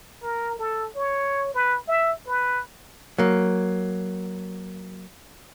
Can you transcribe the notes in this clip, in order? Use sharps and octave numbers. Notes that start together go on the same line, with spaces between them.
A#4
A4
C#5
B4
E5
B4
F#3 A#3